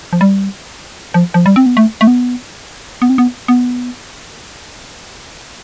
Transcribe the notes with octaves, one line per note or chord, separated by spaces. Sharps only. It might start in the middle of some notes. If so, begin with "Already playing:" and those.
F3
G3
F3
F3
G3
C4
B3
A3
A3
B3
B3
C4
B3
B3